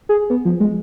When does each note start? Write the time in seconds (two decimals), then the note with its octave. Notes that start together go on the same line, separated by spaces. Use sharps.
0.09 G#4
0.30 B3
0.45 F3
0.60 G#3